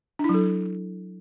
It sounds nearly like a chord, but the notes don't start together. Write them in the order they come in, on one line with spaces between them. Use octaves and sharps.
D4 E4 F#3 A4